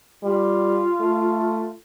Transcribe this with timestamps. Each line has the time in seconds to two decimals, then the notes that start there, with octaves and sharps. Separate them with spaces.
0.24 G3 F4
1.00 A3